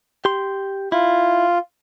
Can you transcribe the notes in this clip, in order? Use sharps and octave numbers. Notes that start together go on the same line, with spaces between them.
G4 C6
E4 F4